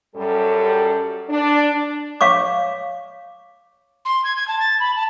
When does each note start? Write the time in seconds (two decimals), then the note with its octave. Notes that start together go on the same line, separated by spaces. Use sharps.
0.15 F#2 G3 A4
1.30 D4
2.21 C#5 F5 C#6 D6
4.05 C6
4.24 G#6
4.36 G#6
4.48 A5
4.60 A6
4.80 B5
4.96 A5